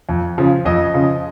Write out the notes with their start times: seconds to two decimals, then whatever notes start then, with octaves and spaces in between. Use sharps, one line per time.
0.09 F2
0.38 C#3 F3
0.65 F2 D#5
0.94 C#3 F3